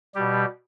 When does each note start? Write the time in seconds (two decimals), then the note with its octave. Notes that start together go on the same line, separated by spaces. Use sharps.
0.15 B2 G3 G4